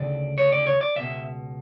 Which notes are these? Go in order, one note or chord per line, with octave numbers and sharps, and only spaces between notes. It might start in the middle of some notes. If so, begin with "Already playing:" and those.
Already playing: D2 C#3 D5
C#5
D5
C#5
D5
C#2 B2 E5